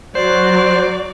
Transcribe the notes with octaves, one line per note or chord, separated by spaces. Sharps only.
F#3 C5 D5